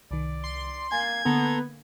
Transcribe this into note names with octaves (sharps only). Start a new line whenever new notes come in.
C2 D#3 D5
C6
A#3 G#5 G#6 A6 C7
D3 A#3 B3 A4 A#5 C6